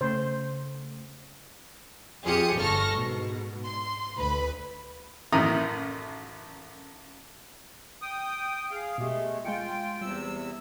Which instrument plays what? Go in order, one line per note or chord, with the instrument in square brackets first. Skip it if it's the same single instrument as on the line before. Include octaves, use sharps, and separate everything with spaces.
[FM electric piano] C#3 A3 [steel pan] C5
[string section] F2 F4 G4 G#4 D#6 C#7
G1 A4 C#6 F6 A#6
G#2 B2
C6
D2 B4 B5
[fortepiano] A1 F#2 D#3 E4 A#5 D#6
[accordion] G5 D#6
G#4 F5
[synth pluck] B2 G4 [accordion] G#3 A3
[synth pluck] G#3 G#5 C#7 [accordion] F4 G5
[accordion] E2 C3 E6 [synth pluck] G3